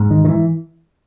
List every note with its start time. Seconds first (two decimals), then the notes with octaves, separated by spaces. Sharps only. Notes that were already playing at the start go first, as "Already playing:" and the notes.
Already playing: G#2
0.11 D#3
0.25 D#3
0.28 E3